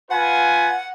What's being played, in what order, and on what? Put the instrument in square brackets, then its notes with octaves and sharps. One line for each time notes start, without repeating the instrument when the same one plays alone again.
[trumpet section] F4 B4 G#5 [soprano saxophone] F#5